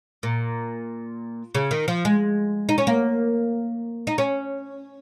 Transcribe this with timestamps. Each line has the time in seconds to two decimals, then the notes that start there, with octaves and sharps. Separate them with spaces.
0.23 A#2
1.55 C#3
1.71 D#3
1.88 F3
2.05 G#3
2.69 D#4
2.78 C#4
2.87 A#3
4.07 D#4
4.18 C#4